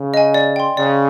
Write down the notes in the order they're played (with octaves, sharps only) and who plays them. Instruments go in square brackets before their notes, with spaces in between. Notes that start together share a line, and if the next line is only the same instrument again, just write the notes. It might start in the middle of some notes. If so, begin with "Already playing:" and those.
Already playing: [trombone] C#3
[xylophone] D#5 G#5
D5
G5 C6
[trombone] C#3 [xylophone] D5